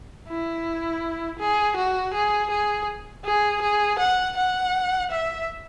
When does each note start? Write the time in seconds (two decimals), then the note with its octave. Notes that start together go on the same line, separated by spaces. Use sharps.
0.28 E4
1.39 G#4
1.77 F#4
2.14 G#4
2.51 G#4
3.24 G#4
3.62 G#4
3.99 F#5
4.37 F#5
5.11 E5